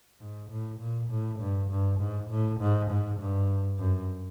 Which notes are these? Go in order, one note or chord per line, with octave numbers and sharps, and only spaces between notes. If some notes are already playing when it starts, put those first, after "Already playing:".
G#2
A2
A#2
A2
G2
G2
G#2
A2
G#2
G#2
G2
F#2